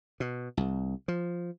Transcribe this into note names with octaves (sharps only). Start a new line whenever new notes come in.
B2
C2
F3